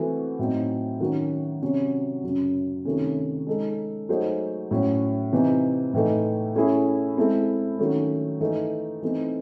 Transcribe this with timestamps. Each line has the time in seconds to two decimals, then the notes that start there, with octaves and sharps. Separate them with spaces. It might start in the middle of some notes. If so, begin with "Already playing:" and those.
Already playing: E3 A3 C4 F#4
0.39 A2 F#3 C4 D#4
1.00 D#3 F#3 C#4 F#4
1.62 C3 F#3 C#4 F#4
2.24 F#2 C#3 F#3
2.85 C3 D#3 A3 C#4
3.47 G#3 D#4 A4
4.09 F#3 A3 D#4 G#4 C5
4.71 A2 F#3 C#4
5.32 C3 E3 C4 D#4
5.93 A2 E3 A3 D#4
6.55 A3 C#4 E4 G#4
7.17 G#3 C4 E4 A4
7.79 D#3 F#3 A3 C#4
8.41 E3 A3 D#4
9.02 E3 A3 C4 D#4